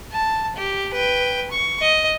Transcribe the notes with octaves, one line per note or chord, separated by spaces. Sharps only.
A5
G4
B4 G5
C#6
D#5